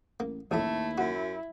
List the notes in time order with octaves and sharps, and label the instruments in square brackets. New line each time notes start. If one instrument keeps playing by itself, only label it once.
[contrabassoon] A1 [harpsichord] A#3
[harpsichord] A1 A2 [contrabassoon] D#2 [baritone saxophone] A3 [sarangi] E4
[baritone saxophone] F#2 [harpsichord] F#4